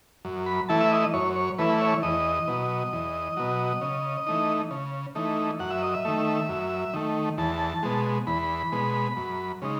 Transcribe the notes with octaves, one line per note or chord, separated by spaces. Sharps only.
F#2
B5
E3 A3 E4 A5
E5
D#5
F#2 C#5
C#5
E3 A3 E4 B4
C#5
E2 D#5
B2 F#3
E2
B2 F#3
C#3
E3 A3 D#4
C#3
E3 A3 D#4
F#2 F#5
E5
D#5
E5
D#3 A3
F#2
D#3 A3
E2 A5
B2 G#3
E2 B5
B2 G#3
F#2
C#3 G#3 D#4